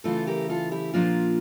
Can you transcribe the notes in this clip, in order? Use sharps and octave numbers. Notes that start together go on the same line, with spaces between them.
C#3 E3 A3 F4 A4
G4 A#4
F4 A4
E4 G4
A#2 F3 A#3 D4 F4